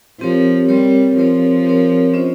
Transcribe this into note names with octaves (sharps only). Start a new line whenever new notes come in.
F3 C4 G4 A#4 C#5
G3 C4 G4 A#4 C#5
F3 C4 G4 A#4 C#5
C4 G4 A#4 C#5
C#4 F4 C5 D#5